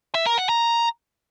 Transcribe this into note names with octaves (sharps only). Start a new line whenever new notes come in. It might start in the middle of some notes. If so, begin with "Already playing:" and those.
E5
A#4
F#5
A#5